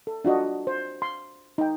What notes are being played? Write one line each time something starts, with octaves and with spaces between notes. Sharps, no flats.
A4
D4 F4 F#4 D#5
C5
C6
D#4 G5